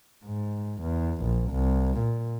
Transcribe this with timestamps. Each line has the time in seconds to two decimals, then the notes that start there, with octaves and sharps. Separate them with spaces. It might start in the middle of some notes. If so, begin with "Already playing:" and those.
0.25 G#2
0.82 E2
1.22 A#1
1.51 C2
1.99 A#2